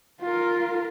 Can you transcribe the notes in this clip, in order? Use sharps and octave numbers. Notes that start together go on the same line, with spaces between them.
F4 A#4